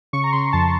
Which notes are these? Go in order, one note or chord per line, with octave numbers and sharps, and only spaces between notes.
C#3 C#6
A#5
C#3 C6
F2 A5